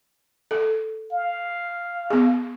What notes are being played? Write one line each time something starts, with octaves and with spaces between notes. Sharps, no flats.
A4
F5
B3 G#4